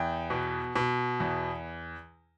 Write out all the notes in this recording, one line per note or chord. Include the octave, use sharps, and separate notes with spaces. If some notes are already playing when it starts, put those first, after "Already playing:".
Already playing: E2 G5
B2
B2
E2